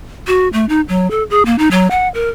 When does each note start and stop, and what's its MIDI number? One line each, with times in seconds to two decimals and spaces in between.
0.27 0.48 66
0.53 0.65 57
0.69 0.81 63
0.89 1.08 54
1.11 1.23 69
1.30 1.46 68
1.46 1.56 58
1.59 1.69 63
1.71 1.88 54
1.91 2.08 78
2.14 2.29 70